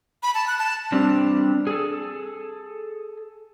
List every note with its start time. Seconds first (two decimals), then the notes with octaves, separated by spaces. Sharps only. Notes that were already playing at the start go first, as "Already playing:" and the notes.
0.23 B5
0.34 A5
0.47 F#6
0.59 A5
0.92 G3 C4 D4
1.67 G#4 A4